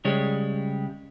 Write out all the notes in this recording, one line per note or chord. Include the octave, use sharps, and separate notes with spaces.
C#3 G3 G#3 C#5